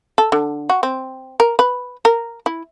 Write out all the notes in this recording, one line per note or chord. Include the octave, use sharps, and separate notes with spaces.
A4
D3
F#4
C4
A#4
B4
A#4
E4